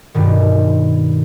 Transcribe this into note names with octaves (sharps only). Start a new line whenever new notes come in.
G2 B2 D#3